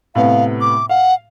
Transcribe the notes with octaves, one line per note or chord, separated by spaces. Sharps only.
A2 C3 B3 F5
D6
F5 F#5